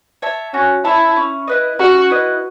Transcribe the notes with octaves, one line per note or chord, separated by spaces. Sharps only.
C#5 E5 A5
C#4 F#4
E4 C#5 E5 A5
C#4
E4 B4 D#5
C#4 F#4
E4 B4 D#5